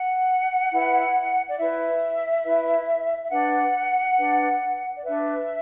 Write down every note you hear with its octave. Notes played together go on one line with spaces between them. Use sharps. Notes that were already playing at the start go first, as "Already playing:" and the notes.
Already playing: F#5
E4 B4
D5
E4 B4 E5
E4 B4
E5
D4 B4 F#5
D4 B4
D5
D4 B4 E5